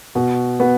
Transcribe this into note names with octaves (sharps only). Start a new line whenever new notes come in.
B2 F#4
B3 F#4